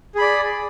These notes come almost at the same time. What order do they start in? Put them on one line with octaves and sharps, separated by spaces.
G#4 B5 D5